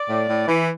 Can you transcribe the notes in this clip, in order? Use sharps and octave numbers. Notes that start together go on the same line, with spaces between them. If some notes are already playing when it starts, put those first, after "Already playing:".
Already playing: D5
A2
A2
E3